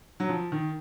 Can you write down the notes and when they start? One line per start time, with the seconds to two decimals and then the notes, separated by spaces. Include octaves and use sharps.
0.20 F#3
0.29 F3
0.52 D#3